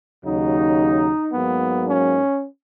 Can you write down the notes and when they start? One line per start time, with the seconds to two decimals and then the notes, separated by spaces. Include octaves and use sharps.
0.24 D#2 C#3 F#3 D#4
1.33 G#2 F#3 A#3 B3
1.87 C#4